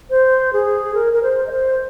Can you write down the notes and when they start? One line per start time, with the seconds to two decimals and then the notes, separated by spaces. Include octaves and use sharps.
0.10 C5
0.53 G#4
0.94 A#4
1.13 A#4
1.23 C5
1.47 D#5
1.52 C5